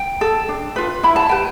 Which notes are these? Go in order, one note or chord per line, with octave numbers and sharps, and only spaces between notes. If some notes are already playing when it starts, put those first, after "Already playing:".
Already playing: G5
A4
D4
F4 B4
E4 B5
A5
G4 B4 G5